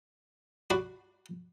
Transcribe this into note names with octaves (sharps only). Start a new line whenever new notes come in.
F#4 D5 B5